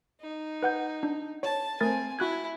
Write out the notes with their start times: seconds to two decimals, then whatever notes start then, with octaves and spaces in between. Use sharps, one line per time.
0.21 D#4
0.63 B4 F#5 G6
1.03 D4
1.43 C#5 A5
1.81 A3 C4 A#4 G#5 A6
2.19 E4 F#4 F#6 G#6